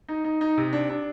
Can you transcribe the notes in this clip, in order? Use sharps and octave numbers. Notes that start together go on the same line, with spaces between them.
D#4
D#4
D#4
C3
D4
D4